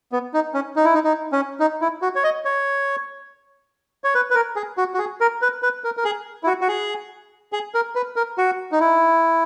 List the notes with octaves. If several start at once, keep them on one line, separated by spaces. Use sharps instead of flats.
B3
D#4
C#4
D#4
E4
D#4
D#4
C#4
D#4
E4
F#4
C#5
D#5
C#5
C#5
B4
B4
A#4
G#4
F#4
F#4
G#4
A#4
B4
B4
A#4
A#4
G#4
E4
F#4
F#4
G#4
G#4
A#4
B4
A#4
F#4
D#4
E4